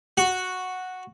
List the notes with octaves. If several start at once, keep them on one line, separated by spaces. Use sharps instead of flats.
F#4